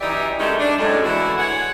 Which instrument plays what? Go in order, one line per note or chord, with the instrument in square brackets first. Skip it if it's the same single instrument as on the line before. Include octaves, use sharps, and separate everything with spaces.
[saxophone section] F#2 E3 D#4 G4 D5 E5
D#3 G#3 A3 C#4 D#4 G4
D4
F#2 A2 G#3
D3 E3 E4 F#4
G#3 G#4 C#5 F#5